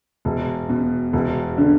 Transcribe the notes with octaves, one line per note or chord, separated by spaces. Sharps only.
E1
B2
E1
D3